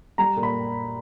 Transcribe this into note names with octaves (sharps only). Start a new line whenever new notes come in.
G3 A#5
A#2
B5